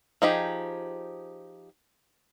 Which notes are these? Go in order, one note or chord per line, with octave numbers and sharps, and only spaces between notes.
F3 D#4 G4 G#4